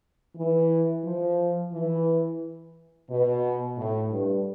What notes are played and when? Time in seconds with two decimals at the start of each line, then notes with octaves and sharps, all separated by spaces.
0.35 E3
1.03 F3
1.72 E3
3.08 B2
3.76 A2
4.10 G2